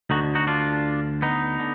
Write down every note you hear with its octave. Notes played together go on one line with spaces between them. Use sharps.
D2 D3 D#4 F#4
D#4 F#4
D4 F4
B3 D#4
D3